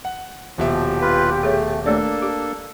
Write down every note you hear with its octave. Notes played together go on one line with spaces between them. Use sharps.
F#5
D#1 B2 F3 G4 E5
F4 B4
A3 G#4 C#5
A3 A#3 D4 A4 C#5 D5
G4